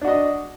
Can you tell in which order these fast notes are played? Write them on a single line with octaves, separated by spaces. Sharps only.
D4 F#4 D#5